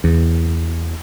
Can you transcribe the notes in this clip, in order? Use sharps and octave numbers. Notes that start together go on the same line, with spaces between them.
E2